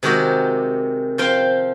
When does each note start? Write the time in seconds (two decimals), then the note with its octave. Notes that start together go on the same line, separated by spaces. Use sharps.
0.03 C3 D#3 G#3 F#4 G4
1.18 F3 F4 C5 F5 G5